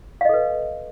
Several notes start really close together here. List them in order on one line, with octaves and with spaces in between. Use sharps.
F5 D#5 A4 B4